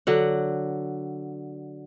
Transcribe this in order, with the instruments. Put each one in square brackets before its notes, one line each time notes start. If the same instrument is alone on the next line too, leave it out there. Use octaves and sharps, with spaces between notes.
[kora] D3 F#3 F#5